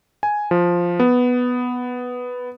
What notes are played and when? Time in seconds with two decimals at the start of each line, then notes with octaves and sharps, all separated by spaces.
0.23 G#5
0.51 F3
1.00 B3